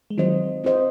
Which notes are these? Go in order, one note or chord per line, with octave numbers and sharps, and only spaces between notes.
G#3
D#3 F#3 C4 F4 C5 D#5
C4 F4 C5 D#5